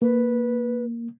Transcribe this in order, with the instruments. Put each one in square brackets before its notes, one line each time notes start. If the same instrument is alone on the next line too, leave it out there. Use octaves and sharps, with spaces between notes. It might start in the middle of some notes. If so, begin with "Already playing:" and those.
[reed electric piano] A#3 [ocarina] B4